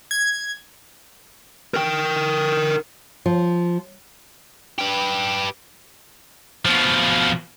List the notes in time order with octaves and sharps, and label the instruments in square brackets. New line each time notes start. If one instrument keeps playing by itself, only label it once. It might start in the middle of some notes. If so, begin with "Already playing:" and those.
[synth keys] G#6
[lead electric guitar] A#4 G5
[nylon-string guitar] F3
[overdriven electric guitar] G4 B4
[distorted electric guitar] B2 F3